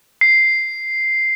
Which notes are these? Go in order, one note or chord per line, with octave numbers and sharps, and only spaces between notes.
C7